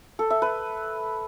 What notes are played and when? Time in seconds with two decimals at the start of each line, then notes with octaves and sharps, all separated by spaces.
0.19 A4
0.30 E5
0.42 B4